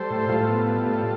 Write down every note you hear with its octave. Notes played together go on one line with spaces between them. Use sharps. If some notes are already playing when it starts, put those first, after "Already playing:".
Already playing: G3 A4 C5
A2
A2 F4 A4
B3
G3
A2